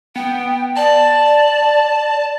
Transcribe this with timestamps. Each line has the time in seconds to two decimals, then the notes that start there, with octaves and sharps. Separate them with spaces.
0.16 B3 G5
0.76 D5 A5